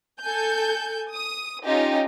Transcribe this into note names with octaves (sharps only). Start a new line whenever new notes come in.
A4 G#5 G6
D#6
C#4 D#4 F4 G4 D#5